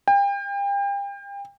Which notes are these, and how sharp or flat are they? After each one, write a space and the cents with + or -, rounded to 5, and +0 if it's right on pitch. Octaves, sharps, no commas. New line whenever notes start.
G5 +35